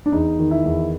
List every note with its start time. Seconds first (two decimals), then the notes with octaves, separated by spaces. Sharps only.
0.06 D4
0.12 E2 D#4
0.39 D#3
0.51 E4
0.65 E2